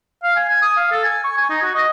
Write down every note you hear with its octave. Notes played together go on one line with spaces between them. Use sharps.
F5
G#5
G#5
D#6
F5
A4
G#5
C#6
G#5
D#4
F#4
D#5